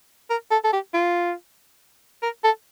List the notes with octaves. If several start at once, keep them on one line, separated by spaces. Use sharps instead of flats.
A#4
A4
A4
G4
F4
A#4
A4